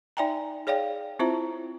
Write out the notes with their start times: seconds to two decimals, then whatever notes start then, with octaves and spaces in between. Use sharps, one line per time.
0.17 D#4 D5 E5 G5 G#5 A#5
0.67 G#4 C#5 D5 F5 G5
1.19 C4 E4 F4 C5 E5 A#5